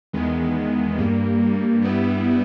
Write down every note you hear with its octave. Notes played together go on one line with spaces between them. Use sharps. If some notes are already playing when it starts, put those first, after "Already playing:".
E2 D#3 G#3 B3
G2 G3 A#3
G2 G3 B3 E4